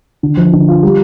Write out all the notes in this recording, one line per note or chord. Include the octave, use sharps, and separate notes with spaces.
D3
F3
D3
F4
G3